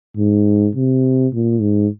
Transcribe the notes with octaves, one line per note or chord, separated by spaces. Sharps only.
G#2
C3
A#2
G#2